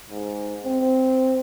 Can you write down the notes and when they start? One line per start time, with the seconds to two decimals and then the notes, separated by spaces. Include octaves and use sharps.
0.10 G#2
0.65 C4